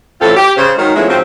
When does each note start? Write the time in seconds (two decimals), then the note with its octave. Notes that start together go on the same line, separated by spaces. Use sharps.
0.21 A2 E3 C4 C#4 F4 A4
0.36 G4
0.57 C#3 C5
0.77 D#3 F#3 G#3
0.95 F3 G#3 A3 B3 C#4 E4
1.08 G#2 F3 F#3 C4